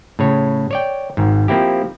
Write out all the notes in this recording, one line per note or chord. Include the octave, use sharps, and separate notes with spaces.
A2 C#3 C#5
C#5 D5 G5
G#1 G#2
F3 A#3 C4 E4 G4